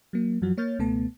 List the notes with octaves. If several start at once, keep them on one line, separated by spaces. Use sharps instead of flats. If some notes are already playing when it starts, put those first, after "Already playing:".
F#3 A#3
F#2 F3 F#3 F#4
A#3 C#5 F6 G6 A6
C#2 B2 A3 B3 A5